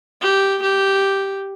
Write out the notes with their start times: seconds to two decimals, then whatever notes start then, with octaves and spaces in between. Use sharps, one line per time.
0.21 G4
0.62 G4